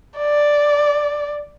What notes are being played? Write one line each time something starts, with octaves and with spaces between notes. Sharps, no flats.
D5